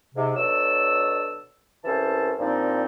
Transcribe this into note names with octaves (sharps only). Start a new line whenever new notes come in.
G#2 C3
B2 F#3 D4 A4 E6
C2 E3 C#4 A4 C5 A5
A#2 F3 G3 C4 D4 D#4